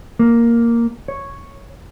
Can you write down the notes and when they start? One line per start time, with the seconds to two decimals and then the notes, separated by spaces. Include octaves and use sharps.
0.19 A#3
1.08 C#5